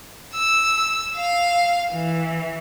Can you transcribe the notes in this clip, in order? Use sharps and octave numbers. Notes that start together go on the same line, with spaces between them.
E6
F5
E3